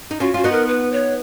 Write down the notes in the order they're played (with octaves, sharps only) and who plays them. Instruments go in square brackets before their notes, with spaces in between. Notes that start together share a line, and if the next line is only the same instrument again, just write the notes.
[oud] D#4
[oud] C#4 F4 [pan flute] F#4
[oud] F4 [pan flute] F#4
[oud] B3 D#4
[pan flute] A#4
B4
C#5